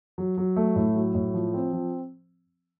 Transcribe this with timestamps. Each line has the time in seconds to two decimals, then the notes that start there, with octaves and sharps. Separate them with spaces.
0.18 F#3
0.37 F#3
0.56 A3
0.76 A2
0.95 F#3
1.15 A2
1.34 F3
1.54 C4
1.73 F3